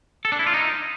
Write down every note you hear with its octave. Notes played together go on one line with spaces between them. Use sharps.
A4
D4
E4
F4
D#4